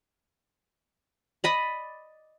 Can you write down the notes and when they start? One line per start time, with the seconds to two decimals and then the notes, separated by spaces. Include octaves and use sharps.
1.44 D5 D#5 B5